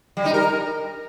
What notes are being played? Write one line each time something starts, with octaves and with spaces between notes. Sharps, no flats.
G3
D#4
A#4